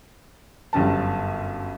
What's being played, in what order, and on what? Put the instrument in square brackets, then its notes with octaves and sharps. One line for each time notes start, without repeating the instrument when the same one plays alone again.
[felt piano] G1 F#2 G3 C#4 A5